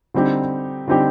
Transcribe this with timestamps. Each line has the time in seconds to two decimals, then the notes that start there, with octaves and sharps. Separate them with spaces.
0.14 D3 G3 C4 D#4 G4
0.88 D3 G3 C4 D#4 G4